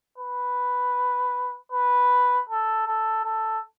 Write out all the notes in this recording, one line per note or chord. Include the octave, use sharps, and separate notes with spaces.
B4
B4
A4
A4
A4